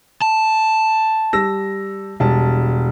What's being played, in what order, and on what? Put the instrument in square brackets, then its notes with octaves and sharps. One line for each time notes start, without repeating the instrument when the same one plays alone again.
[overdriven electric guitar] A5
[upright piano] G3 E6 A#6
E1 G3 A5